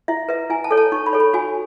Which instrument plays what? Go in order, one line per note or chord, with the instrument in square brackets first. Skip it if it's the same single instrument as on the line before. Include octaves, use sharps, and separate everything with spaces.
[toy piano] E4 E5
B4 E5
E4 G#5
A5
A4 C#5
A5
D#4 C#6
B5
A4 C#5
B5
F#4 G#5